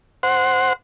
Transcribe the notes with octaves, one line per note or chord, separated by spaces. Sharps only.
C5 F#5